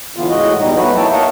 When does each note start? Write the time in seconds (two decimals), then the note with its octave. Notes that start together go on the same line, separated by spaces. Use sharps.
0.17 A2 D3 E3 B3 F4
0.29 A2 G#3 F#4 D#5
0.59 E2 B2 G3 D#4
0.76 F#3 A3 B3 F#4 B4
0.96 A#3 E4 C#5 E5 G5 A5
1.12 A#4 C#5 D#5 F5 F#5 A5